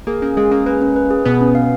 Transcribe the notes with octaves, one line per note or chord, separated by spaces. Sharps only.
A#3 G#4
A#3 C#4
G#3 G#4
A#3 C#4
A#3 B4
C#4
B4
G#4
B2 B3 B4
C#4
F5